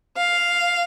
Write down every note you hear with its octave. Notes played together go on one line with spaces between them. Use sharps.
F5